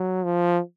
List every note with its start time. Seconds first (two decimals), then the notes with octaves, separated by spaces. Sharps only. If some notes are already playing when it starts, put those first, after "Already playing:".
Already playing: F#3
0.25 F3